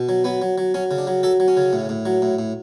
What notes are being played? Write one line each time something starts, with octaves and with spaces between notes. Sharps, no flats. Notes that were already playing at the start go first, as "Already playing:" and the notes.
Already playing: B2
F#3
F#3 B3
F#3
F#3
F#3 C#4
C#3
D4
F#3
F#3 A4
F#3
C#4
C#3
A2
A2
F#3
A2
A2